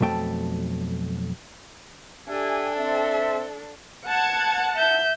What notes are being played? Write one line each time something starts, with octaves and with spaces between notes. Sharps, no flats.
B1 F2 A3 G5
D4 G4 A4 E5 G#5
C4 E5
F#5 A5 G#6 C#7
E5 G6